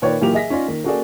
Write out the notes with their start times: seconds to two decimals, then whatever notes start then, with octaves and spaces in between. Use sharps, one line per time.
0.02 A#2 D#3 B4 C#5 D5 G5
0.21 A#2 E3 F#3 G4 A#4 F7
0.33 G#4 D#5 E5 A#6 B6
0.50 C#4 D#4 F4 D5
0.68 D#3 A#3
0.84 A#3 C#4 F#4 G#4 A4 D5